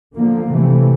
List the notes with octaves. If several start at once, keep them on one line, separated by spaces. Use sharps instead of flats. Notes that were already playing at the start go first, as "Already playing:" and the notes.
D3 F3 A#3
C3 E3 A3